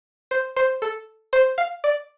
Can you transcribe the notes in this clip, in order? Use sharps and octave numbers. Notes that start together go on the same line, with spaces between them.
C5
C5
A4
C5
F5
D5